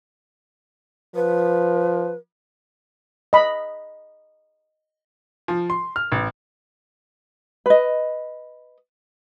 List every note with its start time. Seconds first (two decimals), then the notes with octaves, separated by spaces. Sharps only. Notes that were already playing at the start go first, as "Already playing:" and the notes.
1.15 F3 B4
3.33 D#5 B5
5.48 F3
5.70 C6
5.96 F6
6.12 A1
7.66 B4 D#5